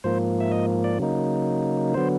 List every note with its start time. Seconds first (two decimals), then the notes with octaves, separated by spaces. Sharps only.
0.04 G#2 F3 A#3 C5
0.40 E5
0.52 D#5
0.84 D5
0.99 C#3 F#3 A#3 D#4
1.94 D3 F#3 B3 C5